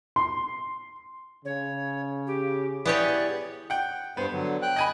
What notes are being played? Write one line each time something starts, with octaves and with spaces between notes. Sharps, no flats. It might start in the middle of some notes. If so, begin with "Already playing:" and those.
C6
C#3 C#5
G4
B3 E4 G4 G#4 C#5 D5 D#6
F#5 G5
G2 B3 C5
D3 F#3
G5 F#6
D#5 G#5 B5